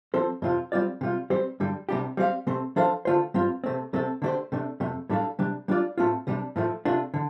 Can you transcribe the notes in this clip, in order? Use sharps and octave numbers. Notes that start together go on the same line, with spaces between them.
F3 C4 A4 C5
F2 C3 F3 C4 F4
G3 C4 F4 D5
C3 G3 F4
G3 C4 G4 C5
G2 D3 G3
C2 C3 G3 D4 G4
G3 C4 G4 F5
C3 A3 C4
F3 D4 A4 C5 F5
D3 A3 F4 C5
G2 G3 C4 F4
C3 A3 C4
C2 C3 A3 C4 A4
D3 A3 D4 G4 C5
C3 A3 D4
F2 C3 A3
A2 G3 D4 A4 F5
C3 G3 D4
G3 D4 F4 D5
A2 A3 C4 F4
C2 C3 G3 D4
A2 F3 A3
C3 A3 D4 F4
D3